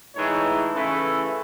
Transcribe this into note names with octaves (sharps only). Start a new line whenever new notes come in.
A2 E3 G#3 D#4 C#5
C#3 E3 A3 E4 B4